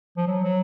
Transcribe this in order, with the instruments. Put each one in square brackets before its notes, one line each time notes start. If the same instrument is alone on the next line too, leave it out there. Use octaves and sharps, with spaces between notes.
[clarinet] F3
F#3
F#3